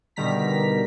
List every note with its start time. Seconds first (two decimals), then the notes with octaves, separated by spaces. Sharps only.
0.16 B2 D3 D#3 G3 A#5 B6